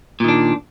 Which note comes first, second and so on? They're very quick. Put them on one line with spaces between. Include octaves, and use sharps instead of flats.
A#2 D#3 D4